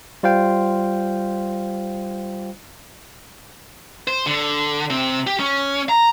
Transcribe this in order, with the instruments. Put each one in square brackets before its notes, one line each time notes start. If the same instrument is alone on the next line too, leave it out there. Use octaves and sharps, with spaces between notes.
[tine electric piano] G3 F4 C5 F5 G5
[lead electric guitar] C5
D3
C3 C4
G4
C#4
A#5